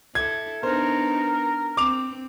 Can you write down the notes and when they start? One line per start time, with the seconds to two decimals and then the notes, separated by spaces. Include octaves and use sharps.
0.15 E4 A4 G#6
0.63 B3 D4 D#4 A#4 C5
1.77 C4 D6 F7